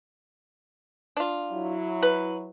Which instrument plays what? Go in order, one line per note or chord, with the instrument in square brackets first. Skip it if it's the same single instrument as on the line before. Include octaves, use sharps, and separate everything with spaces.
[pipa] D4 F4
[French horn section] F#3 E4
[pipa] B4